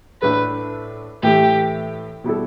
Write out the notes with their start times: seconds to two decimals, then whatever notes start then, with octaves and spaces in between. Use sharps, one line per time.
0.22 A2 A3 D4 A4 B4
1.23 A2 E3 A3 G4
2.24 B2 G3 E4 A4